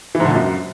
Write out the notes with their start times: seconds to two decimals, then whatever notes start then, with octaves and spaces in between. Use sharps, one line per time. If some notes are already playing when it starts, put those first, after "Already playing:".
0.15 E3
0.20 G#2
0.25 D3
0.30 A#2
0.35 F#2